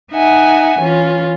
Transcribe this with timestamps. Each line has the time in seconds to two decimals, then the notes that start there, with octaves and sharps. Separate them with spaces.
0.12 D#4 E5 F#5 G#5
0.80 E3 C#4 F4